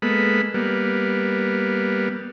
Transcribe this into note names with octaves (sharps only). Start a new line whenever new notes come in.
G#3 A#3 B3 A4 B5
G3 A#3 B3